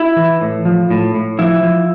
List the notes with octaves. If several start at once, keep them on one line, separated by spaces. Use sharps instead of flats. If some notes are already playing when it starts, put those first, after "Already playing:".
Already playing: E4
E3
A2
F3
A2
A2
F3 E4
F3